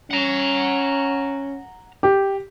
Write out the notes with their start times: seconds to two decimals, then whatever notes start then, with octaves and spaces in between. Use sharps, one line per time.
0.11 C#4 F#5 A#5
2.03 G4